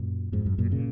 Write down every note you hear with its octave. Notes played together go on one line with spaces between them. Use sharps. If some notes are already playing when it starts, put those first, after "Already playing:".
Already playing: F#2 A#2
F2 G#2
F#2
F#2 A#2
A#2 C#3